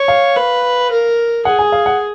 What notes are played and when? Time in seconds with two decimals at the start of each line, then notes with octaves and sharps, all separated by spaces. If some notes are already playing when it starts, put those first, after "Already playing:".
Already playing: C#5
0.08 F5
0.36 B4
0.91 A#4
1.45 G#4 F#5
1.59 G#5
1.72 F5
1.86 F#5